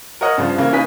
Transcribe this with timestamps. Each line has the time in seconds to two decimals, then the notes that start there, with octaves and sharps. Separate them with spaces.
0.21 A#4 C#5 D#5 F#5 D#6
0.38 G2 C#3 F3 C5
0.58 C#3 E3 A#3
0.72 A#3 C#4 D#4 B4 G#5 B6